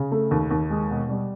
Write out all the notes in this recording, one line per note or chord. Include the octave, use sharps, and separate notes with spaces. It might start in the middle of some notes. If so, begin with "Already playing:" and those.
Already playing: C#3
A3
D#2
D#2
G#3
B2
G3